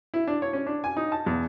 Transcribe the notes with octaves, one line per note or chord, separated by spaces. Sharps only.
E4
D4
C#5
C#4
D4
G#5
D#4
A5
E2